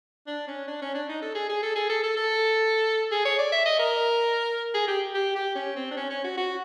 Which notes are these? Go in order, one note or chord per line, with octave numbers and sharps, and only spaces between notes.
D4
C#4
D4
C#4
D4
D#4
A4
G#4
G#4
A4
G#4
A4
A4
A4
G#4
C#5
D5
E5
D#5
A#4
G#4
G4
G4
G4
C#4
C4
D4
C#4
C#4
F#4
F#4